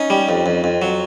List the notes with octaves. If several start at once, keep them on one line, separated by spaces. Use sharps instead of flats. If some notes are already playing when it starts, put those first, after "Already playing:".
Already playing: C#4 D#4
G3
F2
F2
F2
F#3